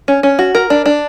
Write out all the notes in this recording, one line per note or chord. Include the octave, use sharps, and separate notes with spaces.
C#4
C#4
F#4
A#4
D4
D4